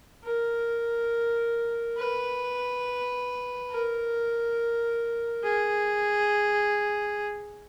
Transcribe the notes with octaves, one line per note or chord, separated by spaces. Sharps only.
A#4
B4
A#4
G#4